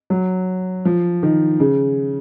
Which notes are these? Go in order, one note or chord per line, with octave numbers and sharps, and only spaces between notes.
F#3
F3
D#3
C#3